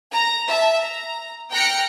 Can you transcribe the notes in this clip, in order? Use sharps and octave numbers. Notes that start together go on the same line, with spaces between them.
A#5
E5 A5
A#5
G5 A#5 F6 F#6 A#6 C#7